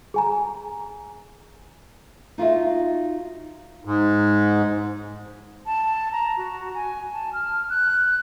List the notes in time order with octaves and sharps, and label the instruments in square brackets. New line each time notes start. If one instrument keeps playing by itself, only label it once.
[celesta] G#4 G#5 A#5
[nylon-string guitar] D#4 F4 F#4 E5
[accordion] G#2
[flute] A5
A#5
F#4
G#5
A5
F6
F#6